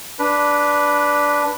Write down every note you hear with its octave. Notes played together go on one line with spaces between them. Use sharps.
D4 B4